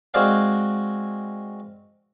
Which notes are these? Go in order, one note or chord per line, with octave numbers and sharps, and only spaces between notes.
G#3 C4 F#4 G#4 D5 F5